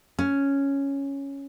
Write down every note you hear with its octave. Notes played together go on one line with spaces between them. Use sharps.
C#4